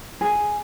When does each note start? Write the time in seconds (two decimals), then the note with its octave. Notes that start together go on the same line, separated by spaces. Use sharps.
0.21 G#4